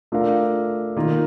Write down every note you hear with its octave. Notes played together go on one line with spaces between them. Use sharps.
A3 D4 F4 A#4 F5
D#3 A#3 F4